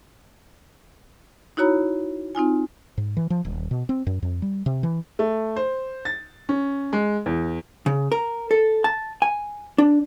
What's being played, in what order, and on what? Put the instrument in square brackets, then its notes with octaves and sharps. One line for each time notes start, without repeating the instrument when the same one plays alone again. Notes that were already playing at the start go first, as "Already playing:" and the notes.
[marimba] D#4 E4 F#4 C#5 A#5 B5
C4 D#4 F4 G#5
[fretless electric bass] G#2
E3
F3
D#1
B2
C4
F#2
F2
G3
C3
E3
[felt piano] A3
C5
A6
C#4
G#3
E2
[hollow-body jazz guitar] C#3
A#4
A4
A5
G#5
D4